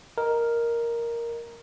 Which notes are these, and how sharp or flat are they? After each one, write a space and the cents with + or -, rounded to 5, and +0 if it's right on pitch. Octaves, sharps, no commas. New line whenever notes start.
A#4 +0 D#5 +0